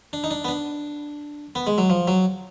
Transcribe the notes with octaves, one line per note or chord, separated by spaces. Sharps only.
D4
D#4
D4
B3
D4
B3
G#3
F#3
F3
F#3